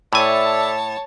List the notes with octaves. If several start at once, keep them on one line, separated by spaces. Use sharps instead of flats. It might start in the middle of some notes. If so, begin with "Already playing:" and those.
A2 A4 C#5 D5 E5 G#5 A5